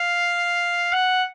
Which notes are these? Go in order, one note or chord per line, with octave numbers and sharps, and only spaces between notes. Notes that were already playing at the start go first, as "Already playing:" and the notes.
Already playing: F5
F#5